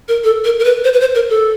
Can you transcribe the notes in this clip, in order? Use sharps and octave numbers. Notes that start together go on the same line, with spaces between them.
A#4
A4
A#4
A#4
B4
C5
B4
C5
A#4
A4